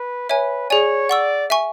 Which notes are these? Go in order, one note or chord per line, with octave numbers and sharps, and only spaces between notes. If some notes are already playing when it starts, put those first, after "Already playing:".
Already playing: B4
B4 C#5 E5 G#5
G#4 C#5 D5 G#5
D5 F#5 C#6 E6
E5 G#5 C#6